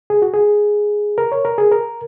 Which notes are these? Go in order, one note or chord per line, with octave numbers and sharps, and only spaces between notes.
G#4
F#4
G#4
A#4
C#5
A#4
G#4
A#4